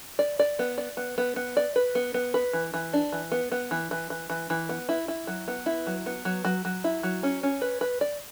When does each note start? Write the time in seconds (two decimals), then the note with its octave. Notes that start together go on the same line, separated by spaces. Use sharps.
0.19 D5
0.39 D5
0.59 B3
0.78 D5
0.97 B3
1.18 B3
1.36 B3
1.57 D5
1.76 B4
1.95 B3
2.14 B3
2.34 B4
2.53 E3
2.74 E3
2.93 D4
3.12 E3
3.32 B3
3.52 B3
3.71 E3
3.91 E3
4.10 E3
4.30 E3
4.50 E3
4.69 B3
4.89 E4
5.08 E4
5.27 F#3
5.48 B3
5.66 E4
5.87 F#3
6.06 B3
6.25 F#3
6.45 F#3
6.65 F#3
6.84 E4
7.03 F#3
7.23 C#4
7.43 C#4
7.62 B4
7.81 B4
8.01 D5